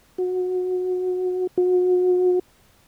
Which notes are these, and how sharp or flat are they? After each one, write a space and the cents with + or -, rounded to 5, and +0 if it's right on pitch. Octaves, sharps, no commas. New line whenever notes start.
F#4 -20
F#4 -35